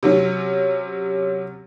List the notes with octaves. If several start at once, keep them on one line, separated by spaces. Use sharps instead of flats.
C3 F#3 C#4